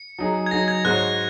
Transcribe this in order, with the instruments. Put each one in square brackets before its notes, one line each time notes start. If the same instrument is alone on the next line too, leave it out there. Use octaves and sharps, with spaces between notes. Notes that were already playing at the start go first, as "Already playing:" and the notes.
Already playing: [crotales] C#7
[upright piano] F#3 D#4 G#4
[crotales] G#6
[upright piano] F#3 D#4 G#4 [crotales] A#6
[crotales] G#6
[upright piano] G#2 G#3 F#4 C#5 [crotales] F#6